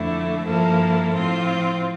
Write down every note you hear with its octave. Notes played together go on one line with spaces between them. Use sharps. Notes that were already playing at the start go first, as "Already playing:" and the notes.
Already playing: F2 D3 A3 E4
G2 F3 A#3 E4 A4
A2 F3 C4 F4